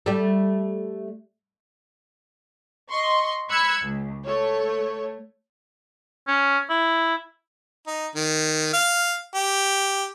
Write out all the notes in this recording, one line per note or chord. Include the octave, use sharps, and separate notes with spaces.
G3 A3
D#5 C6 C#6
B5 E6 F#6 G#6 C#7
C#2
A3 C#5
C#4
E4
D#4
D#3
F5
G4